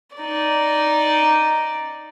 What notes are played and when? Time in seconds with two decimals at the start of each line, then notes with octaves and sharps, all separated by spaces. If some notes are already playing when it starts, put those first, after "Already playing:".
0.16 D#4 D5